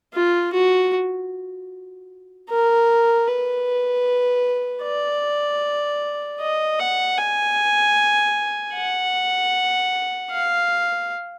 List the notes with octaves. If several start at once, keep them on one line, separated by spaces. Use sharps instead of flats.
F4
F#4
A#4
B4
D5
D#5
F#5
G#5
F#5
F5